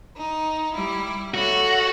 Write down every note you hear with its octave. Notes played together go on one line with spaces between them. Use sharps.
D#4
G3 E4
F#4 A4 C#5 E5